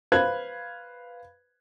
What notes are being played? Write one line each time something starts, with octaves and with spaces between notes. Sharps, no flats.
B4 C5 F5 B5 F#6 G#6